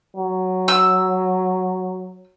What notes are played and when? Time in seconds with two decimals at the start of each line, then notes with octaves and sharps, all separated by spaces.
0.16 F#3
0.68 E6